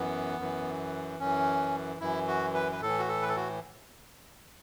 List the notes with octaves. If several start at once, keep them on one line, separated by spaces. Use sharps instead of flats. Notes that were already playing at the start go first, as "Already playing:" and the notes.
Already playing: F#2 E3 B3
F#2 E3
F#2 E3 C#4
F#2 E3 E4
F#4
B4
B4
A2 E3 A4
F#4
A4
B4
A4
F#4